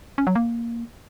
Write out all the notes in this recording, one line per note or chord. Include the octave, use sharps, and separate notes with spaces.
C#4
F#3
A#3